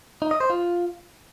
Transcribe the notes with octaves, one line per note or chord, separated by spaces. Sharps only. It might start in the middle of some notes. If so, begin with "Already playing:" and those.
D#4
D#5
C5
F4